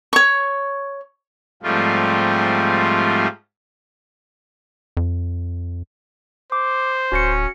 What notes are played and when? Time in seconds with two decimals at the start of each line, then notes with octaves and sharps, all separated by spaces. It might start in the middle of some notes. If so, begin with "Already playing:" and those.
0.13 C#5 C#6
1.63 G#2 F3 G3 A3 C4 F4
4.97 F2
6.52 C5 D6
7.12 D1 C#4 F#4 A#6 C#7